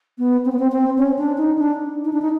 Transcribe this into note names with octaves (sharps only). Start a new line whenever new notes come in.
B3
C4
B3
C4
C4
C#4
D4
D#4
D4
D#4
D4
D#4